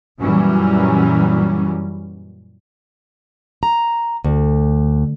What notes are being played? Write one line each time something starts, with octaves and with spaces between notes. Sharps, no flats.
F#2 A#2 E3 F#3 G3 C#4
A#5
D2